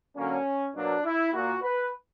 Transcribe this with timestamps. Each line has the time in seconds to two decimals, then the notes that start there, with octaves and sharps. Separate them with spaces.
0.16 D3 F#3 A#3 C#4
0.75 B2 F#3 A#3 D4
1.05 E4
1.33 A#2 A#3 F#4
1.62 B4